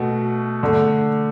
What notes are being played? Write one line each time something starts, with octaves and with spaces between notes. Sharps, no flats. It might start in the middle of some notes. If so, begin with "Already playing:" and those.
Already playing: B2 A3 F#4
D3 A3